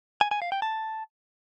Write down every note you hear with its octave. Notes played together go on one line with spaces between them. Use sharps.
G#5
G#5
F5
G5
A5